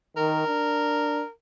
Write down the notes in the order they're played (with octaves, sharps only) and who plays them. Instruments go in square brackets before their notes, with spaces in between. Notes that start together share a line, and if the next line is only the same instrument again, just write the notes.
[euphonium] D#3 [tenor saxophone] A#4
[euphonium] D4